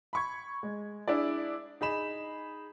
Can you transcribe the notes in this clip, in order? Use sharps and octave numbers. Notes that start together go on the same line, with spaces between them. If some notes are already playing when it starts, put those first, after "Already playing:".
B5 C#6 G#6
G#3
D4 E4 G#4 D5
D#4 G#4 B5 E7